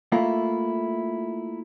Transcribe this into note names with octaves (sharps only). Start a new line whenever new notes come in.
A3 A#3 E4 F4